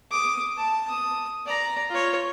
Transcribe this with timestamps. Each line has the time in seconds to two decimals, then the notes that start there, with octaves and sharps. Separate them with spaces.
0.11 D6 D#6
0.57 A5
0.89 D#6
1.46 D5 A#5
1.90 F4 C#5